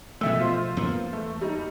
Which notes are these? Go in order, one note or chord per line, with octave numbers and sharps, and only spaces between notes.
B2 F3 A3 D#5 E5 E6
F4 C5 C6
E2 A#3 B3
A3
G3 D#4